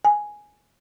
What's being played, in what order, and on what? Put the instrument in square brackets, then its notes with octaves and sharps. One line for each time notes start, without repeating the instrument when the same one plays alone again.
[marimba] G#5